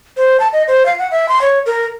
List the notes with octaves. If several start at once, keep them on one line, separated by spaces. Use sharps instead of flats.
C5
A5
D#5
C5
F5
F#5
E5
C6
C#5
A#4